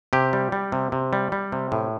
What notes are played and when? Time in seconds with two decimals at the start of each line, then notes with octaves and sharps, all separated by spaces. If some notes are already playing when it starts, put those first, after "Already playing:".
0.13 C3 G4
0.33 G3
0.52 G3
0.72 C3
0.92 C3
1.13 G3
1.32 G3
1.52 C3
1.72 A2